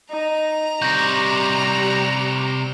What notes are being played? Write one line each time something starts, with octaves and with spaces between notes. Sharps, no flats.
D#4 A#5
C3 G3 F#4 G6 A#6